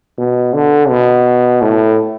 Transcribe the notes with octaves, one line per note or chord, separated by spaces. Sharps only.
B2
D3
B2
A2